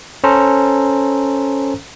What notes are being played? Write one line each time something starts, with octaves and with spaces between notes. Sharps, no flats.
C#4 A4 C5 A#5